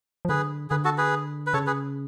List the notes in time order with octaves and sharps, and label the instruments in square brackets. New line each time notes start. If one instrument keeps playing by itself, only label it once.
[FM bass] F3
[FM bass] D3 [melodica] G#4 B4
[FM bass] D3 [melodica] G#4 B4
[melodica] F#4 A4
G#4 B4
B4
[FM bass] C#3 [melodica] A4 C#5
[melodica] G#4 B4